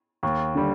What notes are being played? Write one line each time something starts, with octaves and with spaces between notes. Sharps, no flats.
D#2
D3 G3